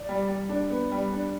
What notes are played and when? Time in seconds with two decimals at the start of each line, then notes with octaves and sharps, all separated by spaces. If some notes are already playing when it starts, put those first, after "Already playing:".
Already playing: D5
0.09 G3
0.29 G3
0.49 D4
0.70 B3
0.92 G3
1.12 D4